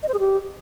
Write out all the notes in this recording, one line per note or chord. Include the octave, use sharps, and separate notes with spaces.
D#5
C5
G#4
G4